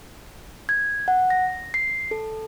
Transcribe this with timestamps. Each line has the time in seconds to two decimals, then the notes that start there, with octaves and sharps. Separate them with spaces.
0.69 G#6
1.08 F#5
1.30 A#6
1.74 C7
2.11 A4